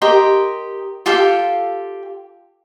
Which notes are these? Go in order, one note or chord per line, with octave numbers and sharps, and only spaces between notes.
G4 A#4 D#5 C6
F4 G4 A4 F5